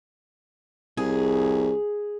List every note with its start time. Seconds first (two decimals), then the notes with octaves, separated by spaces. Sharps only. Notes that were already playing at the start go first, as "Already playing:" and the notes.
0.97 C2 G#4